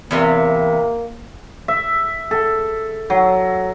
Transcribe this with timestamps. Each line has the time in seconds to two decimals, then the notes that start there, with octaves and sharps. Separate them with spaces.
0.11 E2 C3 A#3
1.68 E5
2.31 A4
3.10 F#3